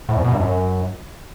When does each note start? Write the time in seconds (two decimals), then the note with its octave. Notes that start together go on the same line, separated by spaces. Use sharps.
0.09 A2
0.17 F2
0.24 B2
0.32 G2
0.40 F#2